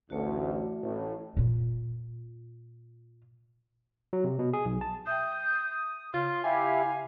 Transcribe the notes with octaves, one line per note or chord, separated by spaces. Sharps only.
A1 D2 A3 F#4
A1 A2
A#2 F4
F#3
C3
B2
G#4
B1
A5
E5 G5 D#6 G6
C#3 F4 C6
E4 G4 F5 G#5